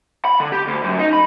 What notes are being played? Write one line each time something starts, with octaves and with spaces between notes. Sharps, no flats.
B5
D3
G4
D2
F#2
D#4
B5